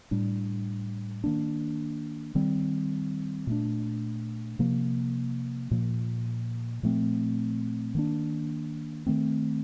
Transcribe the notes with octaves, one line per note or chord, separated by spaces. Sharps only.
A2 G3 D4
D#3 A#3 D4
D#3 G3 C4
A#2 A3 D4
C3 F3 A#3
A#2 F3 A#3
A#2 F3 A3 C4
D#3 A#3 D4
D#3 A3 C4